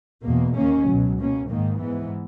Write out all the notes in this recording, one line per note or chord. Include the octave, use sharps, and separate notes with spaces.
E2 B2 A#3
D#2 D#3 A#3 C#4
C#2 B2 F#3
B2 A#3 C#4
G#2 D#3 A#3
G#2 E3 B3